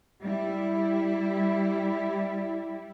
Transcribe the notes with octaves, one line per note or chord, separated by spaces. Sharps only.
G3 E4